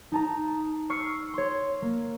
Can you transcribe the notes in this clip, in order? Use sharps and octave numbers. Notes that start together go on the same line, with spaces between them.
D#4 A5 A#5
C#6 E6 F6 C7 C#7
C#5 C6
A#3